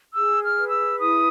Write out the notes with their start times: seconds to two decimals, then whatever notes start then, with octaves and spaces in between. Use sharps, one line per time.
0.14 G#4 E6
0.43 F6
0.56 B4
0.70 E6
0.98 E4 D#6